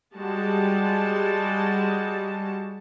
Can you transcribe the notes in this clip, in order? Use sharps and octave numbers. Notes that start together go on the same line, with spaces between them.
G3 G#3 F#4 A5